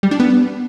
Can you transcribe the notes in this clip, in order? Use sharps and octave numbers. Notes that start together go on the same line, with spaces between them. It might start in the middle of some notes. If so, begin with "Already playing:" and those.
G3
D4
B3